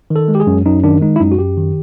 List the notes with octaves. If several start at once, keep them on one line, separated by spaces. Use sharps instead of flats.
D#3
A4
G#3
G4
G#4
F#2
F#2 D#4
D#3 D4
G#3 D#4
E4
F#2 D#4
F#4
F#2 G4
D#3